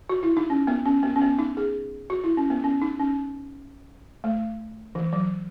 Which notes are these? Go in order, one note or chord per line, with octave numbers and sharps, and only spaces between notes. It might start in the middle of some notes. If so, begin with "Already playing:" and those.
F#4
E4
D#4
C#4
B3
C#4
B3
C#4
B3
D#4
G#4
F#4
E4
C#4
B3
C#4
D#4
C#4
A3
E3
F#3